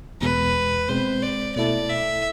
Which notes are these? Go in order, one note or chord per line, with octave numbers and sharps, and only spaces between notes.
E2 B2 G#3 B4
B2 G#3 C4 C5
D5
B2 A3 E4 A4 D5
E5